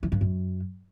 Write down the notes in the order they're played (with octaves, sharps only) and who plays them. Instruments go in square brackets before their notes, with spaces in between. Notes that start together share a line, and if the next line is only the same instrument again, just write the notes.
[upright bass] E3
G2
F#2